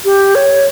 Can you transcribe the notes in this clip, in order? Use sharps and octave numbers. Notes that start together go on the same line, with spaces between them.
G4
C#5